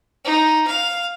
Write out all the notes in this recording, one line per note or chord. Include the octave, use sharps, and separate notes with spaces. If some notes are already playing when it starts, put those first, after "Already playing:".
D#4
F5